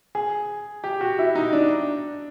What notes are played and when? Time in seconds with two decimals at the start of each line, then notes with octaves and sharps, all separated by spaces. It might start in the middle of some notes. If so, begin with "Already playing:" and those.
0.15 G#4
0.84 G4
1.01 F#4
1.19 E4
1.35 D#4
1.53 D4